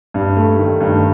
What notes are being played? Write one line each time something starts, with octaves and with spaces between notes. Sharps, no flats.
G2
A3
D#3
G2